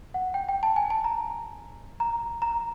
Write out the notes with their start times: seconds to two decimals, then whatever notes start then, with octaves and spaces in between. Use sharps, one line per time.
0.14 F#5
0.34 G5
0.49 G5
0.63 A5
0.76 G#5
0.90 A5
1.04 A#5
2.00 A#5
2.42 A#5